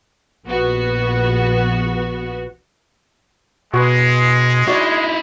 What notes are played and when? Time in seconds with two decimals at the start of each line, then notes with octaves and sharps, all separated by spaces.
0.47 A#1 B3 F#4
3.74 B2 G#3 F#4 B4
4.68 D#4 E4 F#4 D5